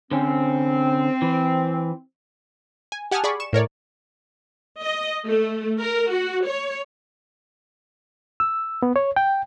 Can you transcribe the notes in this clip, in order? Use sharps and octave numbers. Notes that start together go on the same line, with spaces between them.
D3 C4 C#4
E3
G#5
G4 F#5 G#5 A5 D#6 F6
G#4 D5 B5 C#6
C#6 E7
A2 A#4 C#5 D5
D#5
A3
A#4
F#4
C#5
E6
B3
C#5
G5